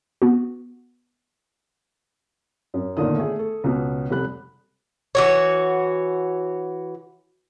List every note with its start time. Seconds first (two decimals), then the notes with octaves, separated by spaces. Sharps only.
0.22 B3 F#4
2.74 F#2
2.97 G1 A#2 D3 D#3 D#6
3.17 A3 G#4
3.39 A4
3.64 C#2 B2
4.10 F1 G3 B5 F#6
5.15 E3 F#4 C#5